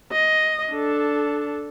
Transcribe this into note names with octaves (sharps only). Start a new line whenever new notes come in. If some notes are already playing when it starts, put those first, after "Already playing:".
D#5
D4 A4